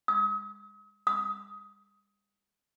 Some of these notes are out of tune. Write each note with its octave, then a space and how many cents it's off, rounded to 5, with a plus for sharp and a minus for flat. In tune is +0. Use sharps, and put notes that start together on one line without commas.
D#6 +40
D#6 +20